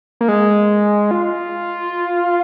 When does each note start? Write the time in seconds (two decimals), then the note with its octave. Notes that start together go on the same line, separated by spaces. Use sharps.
0.21 A#3
0.28 G#3
1.11 F4